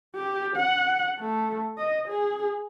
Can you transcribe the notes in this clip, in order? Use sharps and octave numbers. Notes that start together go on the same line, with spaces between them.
G4
F#5
A3
D#5
G#4